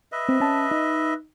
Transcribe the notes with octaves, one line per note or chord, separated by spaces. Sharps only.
B4 D#5 E5
C4
C#4 A5
D#4